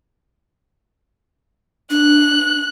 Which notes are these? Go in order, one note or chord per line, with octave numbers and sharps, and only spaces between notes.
D4 F#6